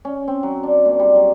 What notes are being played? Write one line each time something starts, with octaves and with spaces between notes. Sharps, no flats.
C#4
C4
F#3
D4
A#2
G3
F#3